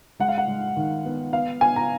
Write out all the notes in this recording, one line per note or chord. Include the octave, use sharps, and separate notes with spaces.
G#3 F#5
F5
F#5
G#3
D#3
B3
B3 F5
B3 G#5
A#5